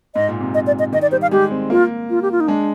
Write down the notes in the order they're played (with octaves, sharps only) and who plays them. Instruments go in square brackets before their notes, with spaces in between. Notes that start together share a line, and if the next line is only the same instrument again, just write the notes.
[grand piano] G#2 [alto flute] D#5
[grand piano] A#2
C3
[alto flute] D#5
D5
D#5
[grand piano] D#3 [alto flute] D#5
[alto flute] D5
[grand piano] G3 [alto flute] C5
[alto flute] F5
[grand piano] G#3 [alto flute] G4
[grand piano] C4
[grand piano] A#3 [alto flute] F4
[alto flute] F4
G4
F4
D#4
[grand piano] G#3 [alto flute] D4